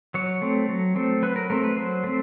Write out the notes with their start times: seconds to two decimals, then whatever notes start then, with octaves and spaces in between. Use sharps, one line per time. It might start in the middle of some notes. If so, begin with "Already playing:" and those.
0.14 F#3 C#5
0.42 A3 C4
0.69 F#3
0.96 A3 C4
1.22 F#3 B4
1.36 A#4
1.50 A3 C4 A#4
1.64 B4
1.77 F#3 C5
2.04 A3 C4